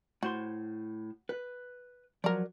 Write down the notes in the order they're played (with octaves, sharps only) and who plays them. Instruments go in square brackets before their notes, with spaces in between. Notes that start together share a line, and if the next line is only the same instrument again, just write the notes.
[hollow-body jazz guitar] A2 C5 C6 [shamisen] F#4
[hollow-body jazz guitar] B4
[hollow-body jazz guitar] F3 F#3 [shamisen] A#4 D5